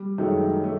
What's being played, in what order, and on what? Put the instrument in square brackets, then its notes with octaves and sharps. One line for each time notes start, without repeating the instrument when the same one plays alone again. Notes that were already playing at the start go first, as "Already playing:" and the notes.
Already playing: [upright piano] G3
[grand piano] F#2 D#3 F#3 A3 [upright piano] G#3
[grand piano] A3